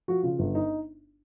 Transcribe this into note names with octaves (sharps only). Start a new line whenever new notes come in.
F3 F#4
C#3 F4
G1
D#4